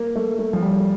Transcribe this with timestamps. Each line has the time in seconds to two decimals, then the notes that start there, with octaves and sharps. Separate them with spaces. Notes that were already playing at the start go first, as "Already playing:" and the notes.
Already playing: A#3
0.15 A3
0.39 A3
0.53 F3
0.62 G3